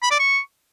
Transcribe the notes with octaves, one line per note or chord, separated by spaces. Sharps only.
B5
D5
C#6